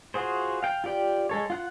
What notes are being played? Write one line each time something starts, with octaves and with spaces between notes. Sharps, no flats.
F4 F#4 G#4 C5
F5 G5
F4 G4 D5 G5
G#3 A4 C#5
F4 F#5 F#6